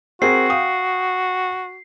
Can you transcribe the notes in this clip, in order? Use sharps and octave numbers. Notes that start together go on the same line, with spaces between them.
C4 F#4 G#4 A#4 C7
F5 G5 D#6